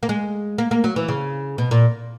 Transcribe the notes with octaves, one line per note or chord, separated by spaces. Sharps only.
A#3
G#3
A#3
A#3
F#3
E3
C#3
B2
A#2